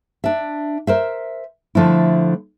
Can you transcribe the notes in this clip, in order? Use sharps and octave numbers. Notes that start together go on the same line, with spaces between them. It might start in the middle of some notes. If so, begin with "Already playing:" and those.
D4 E5
A#4 C5 E5
D3 F3 A3 E4